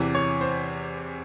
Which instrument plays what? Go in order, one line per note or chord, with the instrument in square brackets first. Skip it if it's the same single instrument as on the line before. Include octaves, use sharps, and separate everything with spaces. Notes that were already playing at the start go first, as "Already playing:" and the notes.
Already playing: [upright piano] E2 C3 E3
C#5
C5